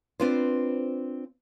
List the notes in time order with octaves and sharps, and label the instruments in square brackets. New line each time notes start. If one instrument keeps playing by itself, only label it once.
[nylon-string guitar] C4 D4 F4 B4 C5